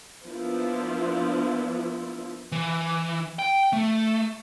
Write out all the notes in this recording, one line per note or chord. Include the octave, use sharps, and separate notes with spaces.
F3 A#3 B3 D4 E4 F4
E3
G5
A3